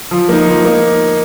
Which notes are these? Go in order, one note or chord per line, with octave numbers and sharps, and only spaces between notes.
F3
A#3 D#4
F3
A#3 D#4